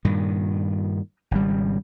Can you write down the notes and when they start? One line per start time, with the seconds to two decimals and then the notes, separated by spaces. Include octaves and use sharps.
0.05 G2 A#2 D#3
1.31 G#1 C#3 G3